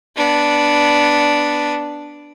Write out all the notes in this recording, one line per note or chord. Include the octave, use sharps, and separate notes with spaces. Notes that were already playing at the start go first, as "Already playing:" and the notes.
B3 D4